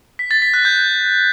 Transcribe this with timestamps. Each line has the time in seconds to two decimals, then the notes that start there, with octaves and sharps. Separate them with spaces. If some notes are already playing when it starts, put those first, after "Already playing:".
0.19 B6
0.31 A6
0.42 B6
0.54 F#6
0.65 G6